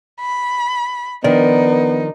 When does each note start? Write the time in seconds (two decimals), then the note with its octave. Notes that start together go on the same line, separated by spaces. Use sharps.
0.20 B5
1.24 D#3 F3 B3 D4 D#4 A#4 D5